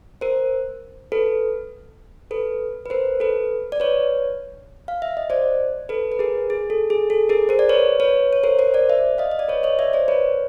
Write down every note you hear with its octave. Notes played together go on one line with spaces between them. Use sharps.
A#4 C5
A4 B4
A4 B4
B4
A#4 C5
A4 B4
D5
B4 C#5
F5
E5
D#5
C5 D5
A4 B4
B4
G#4 A#4
G#4
A4
G#4
A4
G#4 A#4
A#4 C5
D5
B4 C#5
B4 C#5
C#5
A#4 C5
A#4 C5
C5 D5
D5 E5
D#5 F5
D#5
D5
B4 C#5
C#5 D#5
D5 E5
C5 D5
B4 C#5